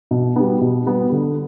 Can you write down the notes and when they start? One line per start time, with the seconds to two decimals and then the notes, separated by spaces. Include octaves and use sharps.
0.11 B2
0.36 G3 B3
0.61 B2
0.86 G3 B3
1.12 D3